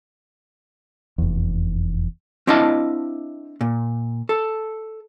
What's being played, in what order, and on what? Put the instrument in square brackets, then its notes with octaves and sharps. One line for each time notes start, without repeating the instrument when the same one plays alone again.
[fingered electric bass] F1 E2
[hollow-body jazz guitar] C4 D4 E4 D#5 F5 A5
A#2
A4